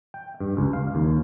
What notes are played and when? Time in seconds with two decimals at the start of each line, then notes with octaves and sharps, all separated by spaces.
0.14 G5
0.40 G2
0.57 C#2
0.73 F5
0.95 D#2